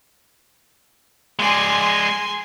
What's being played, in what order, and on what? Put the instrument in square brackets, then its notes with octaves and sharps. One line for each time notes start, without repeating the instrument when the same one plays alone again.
[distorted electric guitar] G#3 D5 [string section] G#5 C6